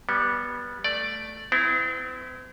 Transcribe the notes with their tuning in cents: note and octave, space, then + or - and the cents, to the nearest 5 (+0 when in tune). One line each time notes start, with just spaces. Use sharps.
G3 +0 B3 -20
A3 +0 D5 +0
C4 -45 E4 +0